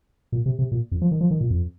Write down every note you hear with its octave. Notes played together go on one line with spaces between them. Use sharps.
A#2
C3
C3
A#2
F2
F3
D#3
F3
D#3
A#2
F2